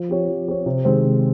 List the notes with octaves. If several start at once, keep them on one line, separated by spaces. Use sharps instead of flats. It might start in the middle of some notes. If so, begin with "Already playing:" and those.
Already playing: F3
C4 G4 C#5
F3
C4 G4 C#5
C3
D#3 G#3 C4 G4
C3